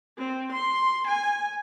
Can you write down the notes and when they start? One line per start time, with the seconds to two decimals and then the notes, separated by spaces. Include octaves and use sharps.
0.17 C4
0.52 C6
1.07 G#5